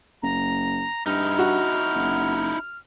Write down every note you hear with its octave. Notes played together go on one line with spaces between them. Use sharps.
F#1 A#5
G2 D#4 E4 F6
F#4
F#1